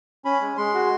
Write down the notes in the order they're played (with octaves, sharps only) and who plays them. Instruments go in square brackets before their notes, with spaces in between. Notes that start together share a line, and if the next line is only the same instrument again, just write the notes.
[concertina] C#4 B5
G#3
G#3 C6
F#4